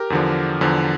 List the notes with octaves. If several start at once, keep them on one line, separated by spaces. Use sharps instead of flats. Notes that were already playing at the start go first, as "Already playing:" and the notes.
Already playing: G4 A#4
E2 D3 F3
E2 D3 F3